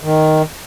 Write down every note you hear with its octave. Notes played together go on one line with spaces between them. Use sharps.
D#3